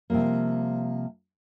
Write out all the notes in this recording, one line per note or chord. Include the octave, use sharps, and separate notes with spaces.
C3 F3 G3 G#3 A#3